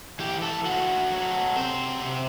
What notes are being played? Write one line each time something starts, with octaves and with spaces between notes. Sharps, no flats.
E3 G4
A3 A4
A3 F#4
F#3
C3 C4 C5
C3